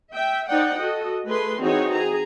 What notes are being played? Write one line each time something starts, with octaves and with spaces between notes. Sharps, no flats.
E5 G5
D#4 C5 D5 F#5 G5
F#4 A4 D#5
A3 G#4 B4 C6
E3 C4 D#4 F#4 G#4 C#5
G#4 A#5